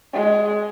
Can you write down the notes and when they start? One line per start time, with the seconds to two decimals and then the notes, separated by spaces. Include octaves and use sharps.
0.13 G#3